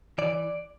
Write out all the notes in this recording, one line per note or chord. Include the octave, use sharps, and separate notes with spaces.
E3 D5